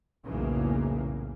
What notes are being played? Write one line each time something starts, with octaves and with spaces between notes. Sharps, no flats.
B1 E2 A2 C#3 E3 A#3